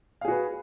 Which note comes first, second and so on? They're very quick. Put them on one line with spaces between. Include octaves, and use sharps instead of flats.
F5 G#4 F#4 B4